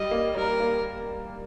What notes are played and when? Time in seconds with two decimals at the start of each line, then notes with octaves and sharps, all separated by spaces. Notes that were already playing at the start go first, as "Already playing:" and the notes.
Already playing: G3 D#5
0.11 A#3
0.36 G3 A#4
0.60 A#3